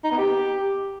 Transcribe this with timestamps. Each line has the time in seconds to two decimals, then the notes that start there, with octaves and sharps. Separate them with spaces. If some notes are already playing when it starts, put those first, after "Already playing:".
0.04 D#4
0.11 B3
0.18 G4